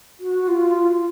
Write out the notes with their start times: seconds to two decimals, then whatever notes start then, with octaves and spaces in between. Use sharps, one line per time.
0.20 F#4
0.48 F4